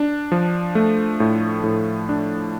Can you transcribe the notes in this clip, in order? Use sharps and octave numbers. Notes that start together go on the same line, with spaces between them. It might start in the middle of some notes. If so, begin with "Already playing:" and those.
Already playing: D4
F3
A3
A2
A2
D4